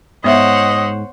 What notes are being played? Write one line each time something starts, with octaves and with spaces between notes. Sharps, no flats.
G#2 B3 C5 C#5 D#5 E5 F#5